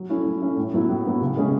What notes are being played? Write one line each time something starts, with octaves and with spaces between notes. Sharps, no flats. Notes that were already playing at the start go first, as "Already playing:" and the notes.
Already playing: F#3
A3 C#4 E4
F#3
A3 C#4 E4
A2
F#3 B3 E4
A2
F#3 B3 E4
C#3
G#3 C#4 G#4